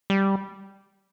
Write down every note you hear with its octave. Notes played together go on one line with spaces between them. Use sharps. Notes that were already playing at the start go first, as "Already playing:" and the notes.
G3